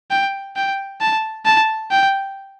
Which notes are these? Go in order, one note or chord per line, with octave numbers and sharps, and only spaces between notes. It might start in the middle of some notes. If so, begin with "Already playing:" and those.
G5
G5
A5
A5
G5